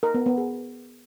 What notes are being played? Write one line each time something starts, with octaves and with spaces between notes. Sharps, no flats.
A#4
B3
B3
G#4